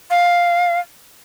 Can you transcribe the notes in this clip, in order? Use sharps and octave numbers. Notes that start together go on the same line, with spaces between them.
F5